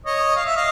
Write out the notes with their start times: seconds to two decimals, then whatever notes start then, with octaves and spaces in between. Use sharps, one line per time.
0.05 C#5 D#5
0.36 F5
0.46 E5
0.56 D#5 F5